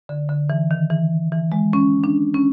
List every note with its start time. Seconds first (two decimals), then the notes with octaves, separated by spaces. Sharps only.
0.09 D3
0.29 D3
0.50 E3
0.71 D#3
0.90 E3
1.32 E3
1.52 G#3
1.73 C#4
2.04 D4
2.34 C#4